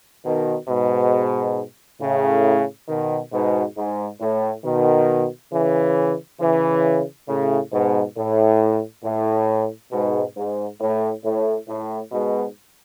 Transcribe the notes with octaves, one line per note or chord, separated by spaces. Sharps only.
B2 D#3
G#2 B2
A2 C#3
B2 D#3
G#2 B2
G#2
A2
B2 D#3
C#3 E3
C#3 E3
A2 C#3
G#2 B2
A2
A2
G#2 B2
G#2
A2
A2
A2
G#2 B2